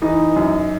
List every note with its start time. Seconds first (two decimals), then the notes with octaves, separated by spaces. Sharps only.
0.02 E3 D#4
0.36 F#2